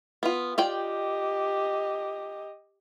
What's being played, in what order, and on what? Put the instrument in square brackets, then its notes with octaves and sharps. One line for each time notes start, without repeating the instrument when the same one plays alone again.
[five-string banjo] B3 F4
[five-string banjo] F4 D5 G5 [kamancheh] G4 D#5